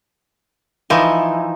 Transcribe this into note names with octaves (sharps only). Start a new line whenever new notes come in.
E3 F3 D#4